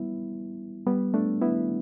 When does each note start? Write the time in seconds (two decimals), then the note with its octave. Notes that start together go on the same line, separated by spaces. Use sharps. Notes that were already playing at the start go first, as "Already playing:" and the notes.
Already playing: G3 B3 E4
0.86 G3 B3
1.14 A3 D4
1.41 B3 E4